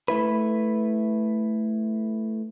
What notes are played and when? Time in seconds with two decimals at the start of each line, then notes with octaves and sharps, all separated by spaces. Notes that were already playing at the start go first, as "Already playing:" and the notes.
0.08 A3 E4 B4